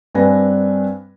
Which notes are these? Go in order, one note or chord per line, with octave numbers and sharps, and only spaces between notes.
G2 C4 D4 B4 G#5 A#6